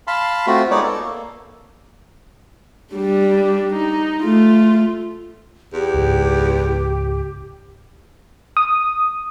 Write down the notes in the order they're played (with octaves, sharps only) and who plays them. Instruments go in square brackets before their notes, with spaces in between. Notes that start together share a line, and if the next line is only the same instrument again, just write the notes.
[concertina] F5 A5 B5 C6
A3 C4 F4 F#4
G#3 B3 D#4 C#5 D5
A4
A#3
[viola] G3 D4
D#4
A3 F4
[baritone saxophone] E2 [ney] G4
[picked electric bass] C#2 G#2
[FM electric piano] D#6